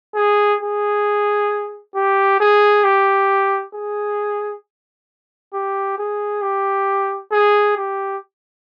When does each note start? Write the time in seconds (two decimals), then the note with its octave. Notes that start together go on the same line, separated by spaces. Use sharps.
0.16 G#4
0.61 G#4
1.96 G4
2.41 G#4
2.84 G4
3.75 G#4
5.54 G4
5.99 G#4
6.42 G4
7.32 G#4
7.77 G4